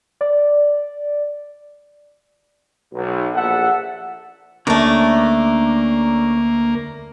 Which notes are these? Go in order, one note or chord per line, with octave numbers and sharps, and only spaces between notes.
D5
B1
A#1 A4 E5 F#5
D2 C3 A3 A#3 C#4 D4 A#4